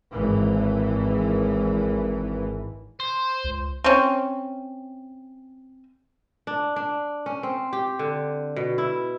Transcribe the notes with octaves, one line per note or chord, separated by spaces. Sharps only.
G#1 E3
C5
C#2
C4 C#4
D4
D4
C#4
C4
G4
D3
B2
E4